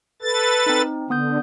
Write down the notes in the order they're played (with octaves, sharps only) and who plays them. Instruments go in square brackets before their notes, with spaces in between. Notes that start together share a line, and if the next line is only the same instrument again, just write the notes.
[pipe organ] A4 B4 A6
[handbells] C4 D#4
[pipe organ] D3 [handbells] B3 D#6 G6